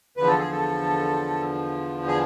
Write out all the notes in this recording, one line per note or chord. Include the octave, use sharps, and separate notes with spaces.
E2 D3 F3 B4
A4
G#4
A4
G#4